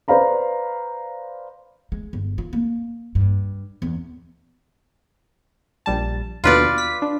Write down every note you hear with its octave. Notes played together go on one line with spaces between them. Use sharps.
B4 C5 D5 F5 A#5 B5
G#3
G1
F4
A#3
G2
E2
A#1 G3 A5
D#2 B2 D3 F4 B4 D5
B6
D4